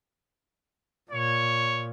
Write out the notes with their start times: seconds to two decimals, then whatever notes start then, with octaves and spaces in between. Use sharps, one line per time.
1.11 A#2 C#5